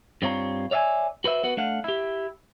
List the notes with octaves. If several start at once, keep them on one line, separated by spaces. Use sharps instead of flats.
G2 G3 C4 F4 C#5 A#5
C#5 D5 E5 F5 G#5
F#4 B4 C5 E5
B3 F#4 B4
A3 D4 F5 F#5
E4 G4